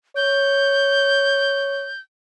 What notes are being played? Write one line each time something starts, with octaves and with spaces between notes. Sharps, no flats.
C#5 G6